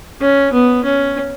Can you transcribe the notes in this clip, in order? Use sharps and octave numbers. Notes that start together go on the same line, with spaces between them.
C#4
B3
C#4